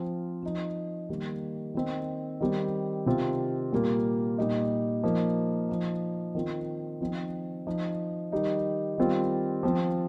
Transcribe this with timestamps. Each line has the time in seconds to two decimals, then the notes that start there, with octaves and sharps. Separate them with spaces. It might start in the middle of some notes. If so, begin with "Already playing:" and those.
Already playing: F3 C4 F4
0.43 F3 D#4
1.10 D#3 G3 A#3
1.75 D#3 C4 D#4
2.41 D#3 G3 C4
3.06 C3 D#3 C4 F4
3.73 A#2 G3 A#3 F4
4.38 A#2 G3 D#4
5.03 F3 A#3 D#4
5.69 F3 D#4
6.35 D#3 C4 F4
7.01 F3 C4 D#4
7.67 F3 D#4
8.32 D#3 G3 D#4
8.98 D#3 G3 C4 F4
9.63 F3 C4 F4